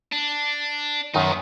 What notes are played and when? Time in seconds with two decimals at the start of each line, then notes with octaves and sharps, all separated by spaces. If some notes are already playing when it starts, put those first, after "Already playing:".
0.12 D4
1.14 F#2 D#3 B3 D#4